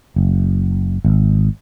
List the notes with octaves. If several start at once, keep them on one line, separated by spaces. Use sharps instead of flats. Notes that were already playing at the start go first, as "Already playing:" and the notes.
F#1
G#1